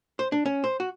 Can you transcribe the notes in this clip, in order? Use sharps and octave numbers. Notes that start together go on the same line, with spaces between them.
C5
D4
C#4
C5
F#4